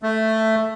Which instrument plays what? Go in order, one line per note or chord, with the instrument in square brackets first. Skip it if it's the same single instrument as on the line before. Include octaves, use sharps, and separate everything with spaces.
[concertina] A3